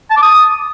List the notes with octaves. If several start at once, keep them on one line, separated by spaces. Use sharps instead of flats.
A5
D6
D#6